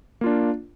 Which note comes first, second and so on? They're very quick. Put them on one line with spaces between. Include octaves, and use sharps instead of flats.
A#3 F4 D4